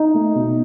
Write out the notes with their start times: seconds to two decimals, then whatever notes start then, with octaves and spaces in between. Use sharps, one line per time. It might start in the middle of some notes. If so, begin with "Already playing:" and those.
Already playing: D#4
0.14 A3
0.35 B2